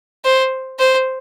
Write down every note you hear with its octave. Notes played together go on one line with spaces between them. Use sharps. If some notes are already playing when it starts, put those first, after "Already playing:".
C5
C5